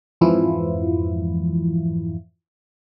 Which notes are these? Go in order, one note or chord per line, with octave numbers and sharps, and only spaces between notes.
F2 G#2 E3 F3 E4 F4